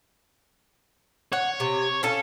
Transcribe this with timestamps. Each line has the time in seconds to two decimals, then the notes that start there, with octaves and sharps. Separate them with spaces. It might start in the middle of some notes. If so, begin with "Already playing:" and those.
1.33 C#5 F#5
1.60 C3
2.03 C#4 A4 F5